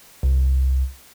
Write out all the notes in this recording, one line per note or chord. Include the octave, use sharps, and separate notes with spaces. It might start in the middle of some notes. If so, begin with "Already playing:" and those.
C2